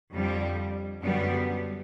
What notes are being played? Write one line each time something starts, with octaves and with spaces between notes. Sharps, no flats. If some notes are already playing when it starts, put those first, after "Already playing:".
F2 D3 G3
F#2 D3 G3 B3